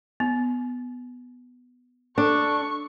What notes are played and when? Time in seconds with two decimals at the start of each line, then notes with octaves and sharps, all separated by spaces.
0.20 B3
2.18 D4 A4 C#6